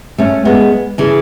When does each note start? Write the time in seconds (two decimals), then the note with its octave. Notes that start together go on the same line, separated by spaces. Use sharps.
0.18 A3 C#4
0.45 G#3 B3
0.98 C#3 E3